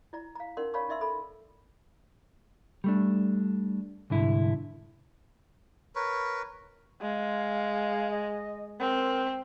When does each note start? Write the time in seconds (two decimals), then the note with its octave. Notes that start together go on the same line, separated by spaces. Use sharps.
0.13 E4 D5 A#5
0.36 F5 A#5
0.57 C#4 D#4 A#4 D5 F#5 C6
0.74 C#5 D5 F5 A5 B5 C#6
0.89 D#4 D5 E5 C6 E6
1.01 A4 B5
2.84 G3 A3 D4
4.10 C2 G#2 D3 E4
5.95 A#4 B4 C#5
7.02 G#3 F5
8.11 D#5
8.80 C4 A#4